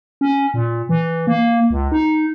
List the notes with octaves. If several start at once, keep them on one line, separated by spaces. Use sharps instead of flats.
C#4
A#2
E3
A#3
C#2
D#4